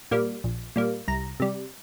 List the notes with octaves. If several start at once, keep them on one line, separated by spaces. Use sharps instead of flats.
A#2 G3 A#3
A#1
A#2 G3 A#3
C2 A#5
C3 G3